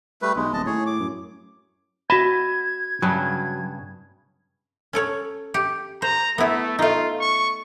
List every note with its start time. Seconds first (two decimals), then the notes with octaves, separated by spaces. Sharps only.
0.22 G3 A3 B4
0.36 B1 G#3
0.53 D#1 D#5 A5
0.66 A2 G#4 C#5
0.86 D6
1.00 F#2
2.10 F#4 D#5 E5 A5 B5 G#6
3.02 G2 C#3 F#3
4.93 C#4 A4 C#5
5.54 G4
6.02 C5 A#5
6.38 A3 B3 E4
6.79 A3 D#4 F4
7.20 C#6